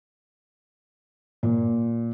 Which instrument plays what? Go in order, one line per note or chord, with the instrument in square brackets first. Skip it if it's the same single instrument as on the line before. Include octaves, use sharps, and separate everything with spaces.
[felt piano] A#2